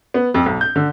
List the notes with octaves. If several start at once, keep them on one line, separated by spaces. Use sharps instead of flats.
B3
F2
B1
G6
D3